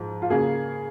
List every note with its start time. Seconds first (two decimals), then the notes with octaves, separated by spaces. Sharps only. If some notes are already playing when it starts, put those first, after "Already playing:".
Already playing: G#2 F3
0.22 F4
0.30 C#3 A#3 G#4